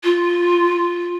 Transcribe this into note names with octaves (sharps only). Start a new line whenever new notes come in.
F4